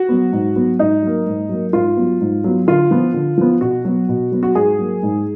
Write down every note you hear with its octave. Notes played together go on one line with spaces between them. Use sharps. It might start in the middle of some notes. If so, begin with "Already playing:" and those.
Already playing: F#4
F#3 B3
G#2
F#3 B3
G#2 D#4
F#3 A#3
G#2
F#3 A#3
G#2 F4
F#3 B3
G#2
F#3 B3
D3 F4
F3 B3
D3
F3 B3
B2 F#4
F#3 B3
B2
F#3 B3
F#4
G#2 G#4
F#3 A#3
G#2